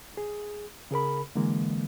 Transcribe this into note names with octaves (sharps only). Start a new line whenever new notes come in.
G#4
C#3 G#4 A#4 B5
D3 E3 G#3 A#3